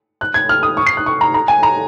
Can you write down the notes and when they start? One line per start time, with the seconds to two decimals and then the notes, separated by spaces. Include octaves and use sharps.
0.21 F#6
0.34 G#6
0.49 F6
0.63 D#6
0.77 C#6
0.87 C7
0.97 F#6
1.06 C#6
1.21 A#5
1.34 A#5
1.48 G#5
1.63 A#5